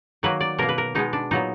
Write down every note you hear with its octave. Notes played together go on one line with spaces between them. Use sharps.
D#3 F#3 A#3 B4
D5
B2 A#3 A#4
B4
A#4
B2 G#3 B3 D#4
D4
A#2 F#3 B3 D#4